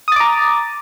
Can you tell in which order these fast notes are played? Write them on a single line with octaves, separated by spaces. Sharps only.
D#6 A6 D6 A#5